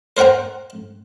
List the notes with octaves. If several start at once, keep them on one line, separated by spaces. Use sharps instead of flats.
A#4 C5 F#5 G5 A#5